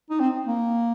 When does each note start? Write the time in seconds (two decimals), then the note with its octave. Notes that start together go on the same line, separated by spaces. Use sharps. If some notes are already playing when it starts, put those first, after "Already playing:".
0.10 D#4
0.20 C4
0.47 A#3